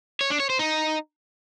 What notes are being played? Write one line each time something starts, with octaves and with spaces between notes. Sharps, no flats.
C#5
D4
C#5
C5
D#4